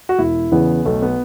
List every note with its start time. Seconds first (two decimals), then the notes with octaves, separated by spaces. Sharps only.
0.09 F#4
0.19 E1 E4
0.51 E2 C#3 E3 B3
0.85 B1 A3
1.02 B3